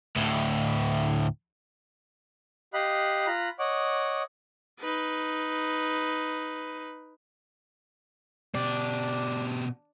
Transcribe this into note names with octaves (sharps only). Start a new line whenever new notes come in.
D2 A2
G4 D#5 F5 B5 F#6
F4 A#5 B5 F#6
C#5 D#5 F#5 D6
D#4 B4
B2 D4 G4